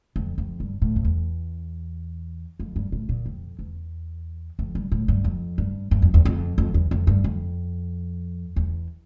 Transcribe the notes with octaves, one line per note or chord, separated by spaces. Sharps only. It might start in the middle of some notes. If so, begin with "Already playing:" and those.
F2
F2
G2
A2
F2
E2
F2
G2
A2
A#2
F2
E2
F2
G2
A2
G2
F2
G2
G2
F2
E2
F2
F2
E2
F2
G2
F2
E2